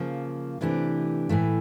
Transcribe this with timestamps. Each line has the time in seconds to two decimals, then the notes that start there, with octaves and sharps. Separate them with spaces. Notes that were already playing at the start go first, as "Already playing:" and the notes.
Already playing: C#3 F3 A#3
0.61 C3 E3 A3 D4 G4
1.29 A2 E3 A3